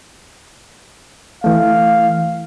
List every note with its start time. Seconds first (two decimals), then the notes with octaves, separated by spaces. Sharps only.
1.44 E3 A3 F5